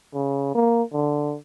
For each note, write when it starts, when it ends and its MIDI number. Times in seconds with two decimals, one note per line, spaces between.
0.14 0.52 49
0.55 0.82 58
0.93 1.36 50